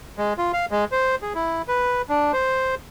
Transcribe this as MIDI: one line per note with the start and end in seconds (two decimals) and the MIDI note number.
0.18 0.33 56
0.38 0.52 65
0.53 0.66 77
0.71 0.85 56
0.92 1.15 72
1.22 1.33 68
1.35 1.62 64
1.68 2.02 71
2.09 2.32 62
2.33 2.75 72